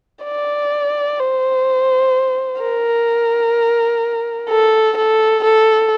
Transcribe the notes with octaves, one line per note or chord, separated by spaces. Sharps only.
D5
C5
A#4
A4
A4
A4